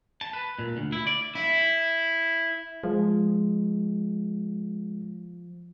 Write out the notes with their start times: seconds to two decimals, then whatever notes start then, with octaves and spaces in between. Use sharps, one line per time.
0.21 A5
0.33 B4
0.59 A#2
0.77 D2
0.92 E4
1.07 D5
1.35 E4
2.84 F3 G#3